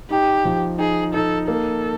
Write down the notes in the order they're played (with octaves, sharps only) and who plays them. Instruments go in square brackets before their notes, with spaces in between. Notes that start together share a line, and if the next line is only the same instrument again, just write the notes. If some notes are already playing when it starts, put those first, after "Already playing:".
[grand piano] D#4 [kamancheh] G4
[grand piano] F3
[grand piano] D#4 [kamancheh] G#4
[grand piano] D#4 [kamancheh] A4
[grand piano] A#3 [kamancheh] A4